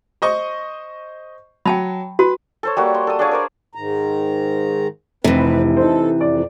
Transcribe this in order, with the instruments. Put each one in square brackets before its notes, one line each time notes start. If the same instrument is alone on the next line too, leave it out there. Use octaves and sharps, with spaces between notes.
[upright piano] C5 D#5 C#6
[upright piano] F#3 [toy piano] G5 A5 B5
[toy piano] F#4 [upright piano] B4
[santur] A4 C5 C#5
G3 A#3 F#4
C6
A4 D#6
D4 G#4 C#5 F5
A#4 C5 D5
[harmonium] G#2 D#3 A#5
[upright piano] F1 [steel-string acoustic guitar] C3 E3 [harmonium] C4 B4
[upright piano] D#4 C5 [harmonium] A4
[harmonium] F2 [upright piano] D5